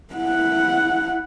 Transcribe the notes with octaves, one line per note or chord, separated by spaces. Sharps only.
E4 F#5